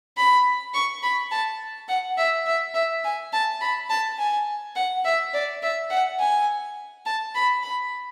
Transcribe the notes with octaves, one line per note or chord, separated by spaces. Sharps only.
B5
C#6
B5
A5
F#5
E5
E5
E5
G#5
A5
B5
A5
G#5
F#5
E5
D5
E5
F#5
G#5
A5
B5
B5